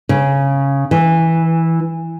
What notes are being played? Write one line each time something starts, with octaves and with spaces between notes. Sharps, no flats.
C#3
E3